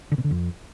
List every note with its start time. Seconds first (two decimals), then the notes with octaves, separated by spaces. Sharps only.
0.12 D3
0.18 B2
0.24 D3
0.31 F2